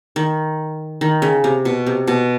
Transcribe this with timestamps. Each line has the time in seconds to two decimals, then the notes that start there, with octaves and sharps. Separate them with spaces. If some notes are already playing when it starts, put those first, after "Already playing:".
0.16 D#3
1.01 D#3
1.22 C#3
1.44 C3
1.65 B2
1.87 C3
2.07 B2